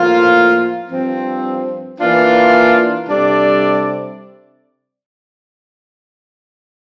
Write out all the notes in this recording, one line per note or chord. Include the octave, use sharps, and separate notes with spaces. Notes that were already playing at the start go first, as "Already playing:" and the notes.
Already playing: A2 F3 A#3 F4
G2 F3 C4
E3 A#3 D4 F4
C3 G3 D4 A4 D5